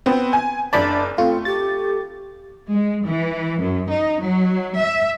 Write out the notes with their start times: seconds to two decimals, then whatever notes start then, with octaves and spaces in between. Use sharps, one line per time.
0.06 B3 C4
0.33 G#5
0.73 F#1 D4 D5 A5 B5
1.18 A3 C4 F4
1.45 G4 A6
2.71 G#3
3.05 E3
3.61 F#2
3.91 D#4
4.22 F#3
4.79 E5